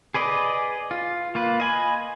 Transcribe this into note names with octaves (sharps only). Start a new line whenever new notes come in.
G#4 B4 D5 D#5
F4
A#3 F4 B4
D#5 G#5 B5